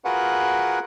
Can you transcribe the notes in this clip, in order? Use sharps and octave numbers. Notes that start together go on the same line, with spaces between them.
F4 F#4 G#4 A#4 B4 F#5